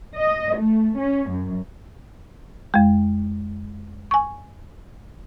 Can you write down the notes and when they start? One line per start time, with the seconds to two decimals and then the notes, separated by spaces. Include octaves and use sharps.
0.17 D#5
0.58 A3
0.99 C#4
1.30 F#2
2.74 F2 G#3
4.11 G#5 C#6